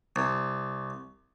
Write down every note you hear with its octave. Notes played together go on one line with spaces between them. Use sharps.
C2